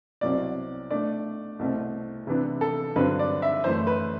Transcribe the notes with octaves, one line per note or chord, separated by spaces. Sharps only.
C2 B2 F#3 C4 D5
B2 A3 D4 D5
C2 B2 A3 C4
C3 E3 B3 D4
A4
G2 D3 F#3 C4 B4
D5
E5
F#2 E3 A3 C5
B4